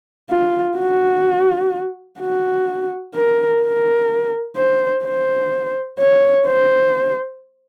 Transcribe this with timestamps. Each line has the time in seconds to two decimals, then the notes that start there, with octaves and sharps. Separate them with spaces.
0.30 F4
0.78 F#4
2.20 F#4
3.15 A#4
3.62 A#4
4.57 C5
5.04 C5
5.99 C#5
6.47 C5